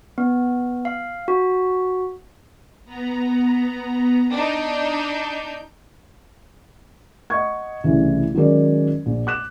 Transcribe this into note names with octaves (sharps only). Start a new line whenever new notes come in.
B3
F5
F#4
B3 A#5
D4 D#4 G6
D#5 F#5 C#6 G#6
C2 C#3 E3 A3
D#3 F#3 G#3 C#4 A#4 D5
A#1
D6 F#6 E7